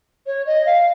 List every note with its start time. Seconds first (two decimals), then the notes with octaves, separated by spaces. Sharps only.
0.27 C#5
0.46 D#5
0.66 F5